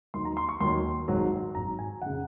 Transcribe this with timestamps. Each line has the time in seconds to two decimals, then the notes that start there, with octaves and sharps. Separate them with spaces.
0.14 D#2 D#3 F#3 C6
0.25 A#5
0.37 C6
0.49 C#6
0.60 D#2 D#3 F#3 C6
1.08 G#1 G#2 F#3
1.55 G#1 G#2 F#3 A#5
1.79 G#5
2.02 F1 C#3 F#5